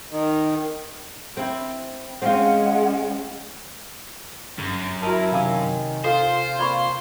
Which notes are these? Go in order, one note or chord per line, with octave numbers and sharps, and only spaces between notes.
D#3
C4 E4
G#3 C4 C#4 F4 F#5
G1 F#2
E4 F#4 A#4 A5
C3 D#3 F5 G#5 A5 E6
F4 A4 C5 F5
A#3 C4 F4 D5 B5 C#6